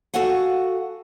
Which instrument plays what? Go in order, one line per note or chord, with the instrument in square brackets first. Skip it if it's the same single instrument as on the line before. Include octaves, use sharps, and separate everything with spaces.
[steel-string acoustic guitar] F#4 A4 F5 F#5 G#5